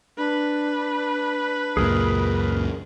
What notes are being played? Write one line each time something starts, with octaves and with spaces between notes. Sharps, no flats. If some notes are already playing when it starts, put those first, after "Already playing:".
D4 B4
C#2 F#2 A#2 G#4 A#4